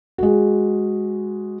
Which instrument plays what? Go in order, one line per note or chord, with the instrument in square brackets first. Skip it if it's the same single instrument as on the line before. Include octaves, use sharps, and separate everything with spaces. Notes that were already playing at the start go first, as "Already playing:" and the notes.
[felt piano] G#3 F#4